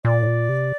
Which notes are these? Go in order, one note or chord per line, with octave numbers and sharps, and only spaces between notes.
A#2 D5
A2
A#2
C3